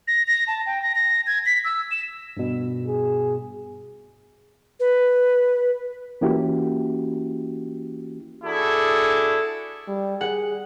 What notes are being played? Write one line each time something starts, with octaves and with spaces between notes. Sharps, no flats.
A#6
A#6
A5
G5
A#6
A#6
G#6
B6
E6
E7
G2 B2
G#4
B4
E3 A#3 C#4 E4 F#4 G4
D4 E4 F#4 G#4 A4
G3
G#4 F#5